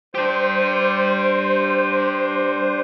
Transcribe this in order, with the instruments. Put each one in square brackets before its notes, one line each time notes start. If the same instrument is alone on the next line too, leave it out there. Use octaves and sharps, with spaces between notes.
[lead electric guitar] D4 G4 [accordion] C5